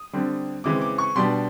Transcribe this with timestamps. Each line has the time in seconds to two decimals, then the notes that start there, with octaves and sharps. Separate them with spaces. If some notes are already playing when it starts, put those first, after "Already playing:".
Already playing: D#6
0.13 D3 G3 C4
0.64 C#3 E3 G#3 C4 D6
0.81 D6
0.98 C#6
1.15 B2 G3 B3 D4 C6